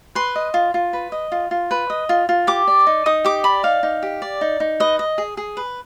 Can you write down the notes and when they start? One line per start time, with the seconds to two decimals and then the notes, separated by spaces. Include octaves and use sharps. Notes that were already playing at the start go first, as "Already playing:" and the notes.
0.15 B4 C6
0.36 D#5
0.54 F4
0.74 F4
0.93 B4
1.12 D#5
1.32 F4
1.51 F4
1.71 B4
1.90 D#5
2.09 F4
2.29 F4
2.47 G4 D6
2.67 D5
2.87 D#4
3.06 D#4 D#6
3.25 G4 D6
3.44 D5 B5
3.63 D#4 F5
3.83 D#4
4.03 G4
4.22 D5
4.41 D#4
4.60 D#4
4.80 B4 D#5
4.99 D#5
5.18 G#4
5.37 G#4
5.57 B4